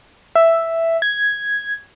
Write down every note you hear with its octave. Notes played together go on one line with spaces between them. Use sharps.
E5
G#6